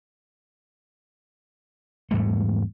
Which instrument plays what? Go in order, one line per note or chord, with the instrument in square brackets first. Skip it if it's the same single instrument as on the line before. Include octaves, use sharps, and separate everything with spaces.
[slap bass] E2 G#2 G3 A3